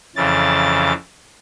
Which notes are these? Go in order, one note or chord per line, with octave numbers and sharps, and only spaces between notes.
F2 C#3 E3 A6